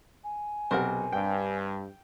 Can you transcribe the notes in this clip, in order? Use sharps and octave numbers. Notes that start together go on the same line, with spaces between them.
G#5
B1 C3 C4 A#4 F#5
G2 G5